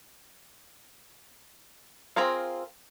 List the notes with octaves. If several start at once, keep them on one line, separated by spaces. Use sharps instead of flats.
C4 F4 G#4 A#4 F5